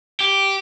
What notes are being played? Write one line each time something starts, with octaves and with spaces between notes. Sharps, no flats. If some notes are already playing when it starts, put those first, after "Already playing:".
G4